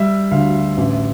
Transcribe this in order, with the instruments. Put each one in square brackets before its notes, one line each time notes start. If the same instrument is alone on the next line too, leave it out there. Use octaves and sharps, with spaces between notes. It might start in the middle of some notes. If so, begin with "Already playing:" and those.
Already playing: [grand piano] G3 E5
D2 F5
A1 E5